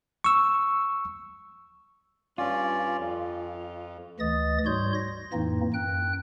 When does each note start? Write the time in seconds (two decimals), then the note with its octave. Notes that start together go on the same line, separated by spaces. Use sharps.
0.24 C#6 E6
2.38 G2 C#4 F4 D5
2.99 F2
4.20 D2 E3 D#5 D#6 A6
4.66 G#2 G3 F#4 C#5 C6 G6
4.95 A#6
5.33 F2 A2 E3 A#3 C4 D#4
5.74 F#2 G5 F#6